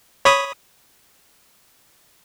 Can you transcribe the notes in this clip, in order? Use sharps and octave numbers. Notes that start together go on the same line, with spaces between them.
C#5 B5 D#6